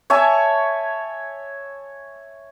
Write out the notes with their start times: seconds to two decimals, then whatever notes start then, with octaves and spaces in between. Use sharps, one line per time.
0.10 C#5 E5 G#5 A5